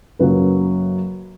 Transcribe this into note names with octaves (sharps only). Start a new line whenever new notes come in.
F#2 C#3 F#3 A#3 B4